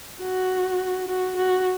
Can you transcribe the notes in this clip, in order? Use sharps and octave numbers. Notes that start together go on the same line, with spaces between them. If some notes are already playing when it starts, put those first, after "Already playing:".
F#4
F#4
F#4